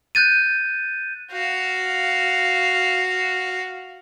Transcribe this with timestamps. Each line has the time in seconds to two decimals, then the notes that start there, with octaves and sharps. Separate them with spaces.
0.15 F#6 G6 A6 D#7
1.32 F#4 F5